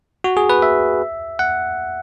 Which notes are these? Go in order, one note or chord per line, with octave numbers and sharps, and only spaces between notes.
F#4
G#4
B4
E5
F#5